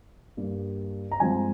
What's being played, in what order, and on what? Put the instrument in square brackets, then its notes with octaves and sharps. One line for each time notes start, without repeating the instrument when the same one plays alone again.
[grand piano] G2 G3 A#3
A#5
G2 F3 G#3 C4 G#5